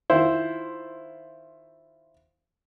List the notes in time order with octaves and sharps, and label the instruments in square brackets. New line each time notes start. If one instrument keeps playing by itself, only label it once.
[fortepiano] D#3 E4 F4 C5